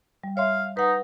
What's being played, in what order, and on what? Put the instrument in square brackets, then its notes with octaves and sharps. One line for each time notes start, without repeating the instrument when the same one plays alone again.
[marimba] G3
[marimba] C#5 E5 C6 [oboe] F5
[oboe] D#4 [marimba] B4 F#5